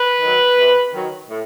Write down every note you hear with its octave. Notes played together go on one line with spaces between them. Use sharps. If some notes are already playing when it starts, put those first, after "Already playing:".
Already playing: B4
D#3 F#3
C3
D#3 F#3
A2